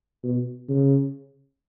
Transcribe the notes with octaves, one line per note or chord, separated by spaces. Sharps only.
B2
C#3